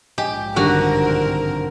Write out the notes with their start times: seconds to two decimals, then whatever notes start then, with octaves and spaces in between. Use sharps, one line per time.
0.18 A#1 G#2 G4 D#5 G5 G#5
0.56 G2 D3 D#3 G3 C4 F#4 A#4